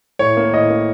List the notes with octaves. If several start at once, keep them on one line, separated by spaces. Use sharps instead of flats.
A2 C#5
A#3
A2 D#5
A#3